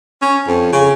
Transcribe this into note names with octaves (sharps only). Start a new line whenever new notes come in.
C#4
F2
C#3